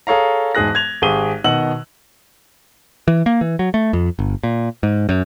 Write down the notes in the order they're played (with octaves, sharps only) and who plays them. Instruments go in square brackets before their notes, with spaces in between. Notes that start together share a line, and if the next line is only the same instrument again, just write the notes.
[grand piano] G#4 A4 C#5 F5 A#5
E1 G#2 G#4 F#6 A#6
G#6 F7
G#1 G4 G#4 D#7 G7
B2 D#3 D#5 F#5 E6 F#7
[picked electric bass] E3
A#3
E3
F#3
A3
F2
G1
A#2
G#2
F#2